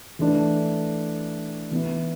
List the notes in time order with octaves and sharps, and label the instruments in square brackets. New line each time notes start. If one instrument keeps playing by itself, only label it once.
[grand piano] E3 A3 D4 A4
E3 B3 E4